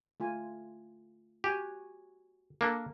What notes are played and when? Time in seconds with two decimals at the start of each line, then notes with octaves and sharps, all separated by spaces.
0.20 A3 F4 G#5
1.44 F#4 G4 G#5
2.61 A#3 D4 A4 A#4